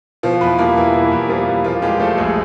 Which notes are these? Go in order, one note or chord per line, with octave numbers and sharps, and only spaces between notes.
B2 F3 F4
E2 B3 B4
G3 A#3 A#4
E2 E3 E4
B2 E3 E4
E2
F3 G3 F4
E2
A#2 F3 F4
G3 G#3 G4
F3 A3 A4
A#1 G#3 G#4